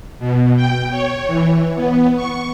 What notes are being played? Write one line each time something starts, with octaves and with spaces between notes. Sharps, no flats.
B2
G5
C#5
E3
B3
C#6